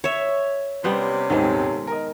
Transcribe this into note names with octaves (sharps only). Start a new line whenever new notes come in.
C#5 E5
C3 G3 B3 C#4 C5
D#1 G#2 D#3 G#3 C4
A#4 D#5